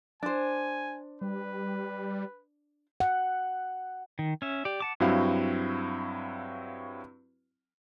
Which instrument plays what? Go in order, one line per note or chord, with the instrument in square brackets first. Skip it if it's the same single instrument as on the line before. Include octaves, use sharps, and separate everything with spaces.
[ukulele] D4 C5 [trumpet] G#5
[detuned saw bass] G3 [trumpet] B4
[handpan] F#5
[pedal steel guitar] D#3
C#4 E5
G4 D5
F#5 A5 D6
[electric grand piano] G2 F#3 C4 E4 F#4 F5